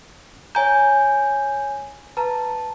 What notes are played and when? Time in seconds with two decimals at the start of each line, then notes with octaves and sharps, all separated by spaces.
0.55 C#5 G#5 A#5 G6
2.17 B4 A5 A#5